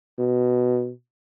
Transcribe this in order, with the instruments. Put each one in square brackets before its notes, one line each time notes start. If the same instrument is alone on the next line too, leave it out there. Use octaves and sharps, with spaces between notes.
[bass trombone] B2